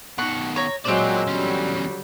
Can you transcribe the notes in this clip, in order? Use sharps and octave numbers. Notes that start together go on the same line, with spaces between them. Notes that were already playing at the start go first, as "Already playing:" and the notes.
B2 D#3 F#5 C#6
C#5 A#5
A#2 F#3 G#3 C4 A#4 C5 D5
E2 D3 F#3 G3 C#4